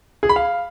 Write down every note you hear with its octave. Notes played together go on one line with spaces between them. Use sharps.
G#4
B5
F5